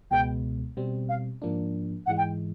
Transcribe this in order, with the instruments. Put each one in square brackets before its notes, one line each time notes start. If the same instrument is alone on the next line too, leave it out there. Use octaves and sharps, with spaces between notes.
[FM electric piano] C#2 B2 G#3 B3 [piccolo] G5
[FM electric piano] B2 G3 C4
[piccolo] F5
[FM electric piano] G#2 F3 A#3 D4
[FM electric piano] G#2 E3 G#3 [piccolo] F#5
[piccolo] G5